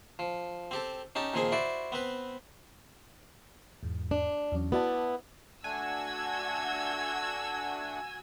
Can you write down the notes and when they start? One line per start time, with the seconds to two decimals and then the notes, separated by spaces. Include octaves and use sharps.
0.19 F3
0.71 C4 G4 A4
1.15 C#4 D#4 G4 A5
1.34 A#2 D#3 F3 C4 G#4 G#5
1.52 E4 F#4 C5 D5
1.92 B3 C4 B4
3.83 E2 G#2
4.11 D4
4.52 E2 F#3 C#4
4.72 B3 E4 F#4 D5 A5
5.64 A3 D4 F#4 F#5 G#5 E6 G#6